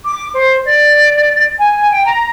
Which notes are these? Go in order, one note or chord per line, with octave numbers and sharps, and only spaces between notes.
D6
C5
D5
G#5
G5
A#5